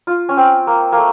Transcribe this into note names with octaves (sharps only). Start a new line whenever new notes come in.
F4
C#4
C4
A#3
A3 A#3